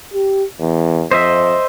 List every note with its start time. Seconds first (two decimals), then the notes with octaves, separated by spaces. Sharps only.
0.14 G4
0.60 E2
1.11 F2 C5 D#5 E5